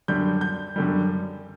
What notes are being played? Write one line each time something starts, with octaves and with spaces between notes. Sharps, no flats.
F#2 D3 G3 G6
G6
F#2 D3 G3